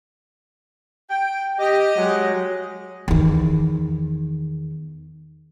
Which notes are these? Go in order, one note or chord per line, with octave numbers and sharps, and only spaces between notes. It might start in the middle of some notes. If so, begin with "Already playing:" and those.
G5
G4 D#5
F#3 G#3
E2 D#3